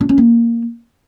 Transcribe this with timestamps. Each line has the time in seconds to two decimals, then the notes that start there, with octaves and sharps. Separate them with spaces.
0.01 D4
0.09 C#4
0.18 A#3